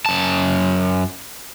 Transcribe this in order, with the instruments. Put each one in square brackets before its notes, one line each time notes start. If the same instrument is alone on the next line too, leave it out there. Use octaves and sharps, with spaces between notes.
[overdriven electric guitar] F#2 A5